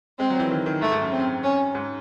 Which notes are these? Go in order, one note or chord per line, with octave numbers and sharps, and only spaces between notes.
G#3 C4
F#3
E3
D#3
D#3
G#2 A3
G#2
F#2
C4
C#4
G#2